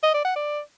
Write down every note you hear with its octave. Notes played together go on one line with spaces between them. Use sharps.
D#5
D5
F#5
D5